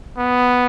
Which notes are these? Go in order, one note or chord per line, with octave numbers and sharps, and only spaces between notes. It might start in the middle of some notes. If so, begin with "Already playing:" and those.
B3